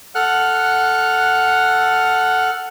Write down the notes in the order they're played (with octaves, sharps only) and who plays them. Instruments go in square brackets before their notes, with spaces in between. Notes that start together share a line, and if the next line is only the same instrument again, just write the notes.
[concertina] A4 F#5 F6 F#6